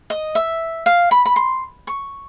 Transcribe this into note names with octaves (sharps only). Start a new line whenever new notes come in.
D#5
E5
F5
B5
B5
C6
C#6